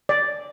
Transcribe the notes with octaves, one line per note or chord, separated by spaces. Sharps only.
D5